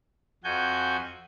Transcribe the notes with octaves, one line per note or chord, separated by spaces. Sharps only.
F2 F#4 G#5 G6